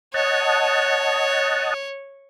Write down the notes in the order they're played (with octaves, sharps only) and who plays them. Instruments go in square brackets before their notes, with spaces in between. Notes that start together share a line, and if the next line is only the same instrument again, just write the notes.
[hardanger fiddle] C#5 [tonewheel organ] D#5 F#5 A5